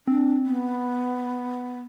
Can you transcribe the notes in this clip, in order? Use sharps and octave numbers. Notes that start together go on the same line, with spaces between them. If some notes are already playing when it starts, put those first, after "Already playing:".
C4 D4
B3